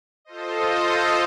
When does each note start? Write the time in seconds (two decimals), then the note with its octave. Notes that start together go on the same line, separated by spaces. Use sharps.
0.25 F4 A4 C5 D#5